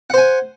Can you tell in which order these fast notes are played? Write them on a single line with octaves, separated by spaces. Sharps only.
F#5 C5 G#5